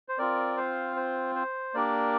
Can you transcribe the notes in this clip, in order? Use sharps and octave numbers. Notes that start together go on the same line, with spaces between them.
C5
C4 F4 A#4 D5
C5 F5
C5
C5
A#3 D4 G4 A#4 D5